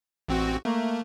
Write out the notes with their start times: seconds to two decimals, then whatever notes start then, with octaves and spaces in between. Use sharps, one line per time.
0.28 A1 C4 F#4
0.65 A3 A#3